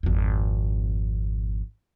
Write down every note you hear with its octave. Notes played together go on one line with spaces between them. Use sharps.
G#1 F2